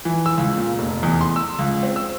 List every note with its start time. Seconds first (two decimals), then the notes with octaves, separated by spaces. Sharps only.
0.05 E3
0.26 E6
0.38 C#2
0.57 A#2
0.79 F1
1.03 E2
1.21 C6
1.36 E6
1.59 C#2
1.83 C4
1.96 E6